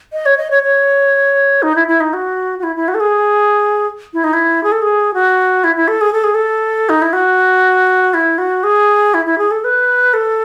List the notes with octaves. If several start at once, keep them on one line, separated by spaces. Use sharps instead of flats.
D#5
C#5
D#5
C#5
C#5
D#4
E4
E4
D#4
F#4
F#4
E4
E4
F#4
A4
G#4
E4
D#4
E4
G#4
A4
G#4
F#4
E4
E4
A4
G#4
A4
G#4
A4
D#4
E4
F#4
E4
F#4
G#4
E4
E4
G#4
A4
B4
A4